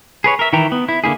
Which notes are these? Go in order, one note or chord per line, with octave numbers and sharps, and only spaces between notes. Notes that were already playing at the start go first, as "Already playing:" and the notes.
G#4 B4 C#5
A#4 E5
D#3 E3 E4 G5 A#5
B3
E4
D3 A#3 E4 G#4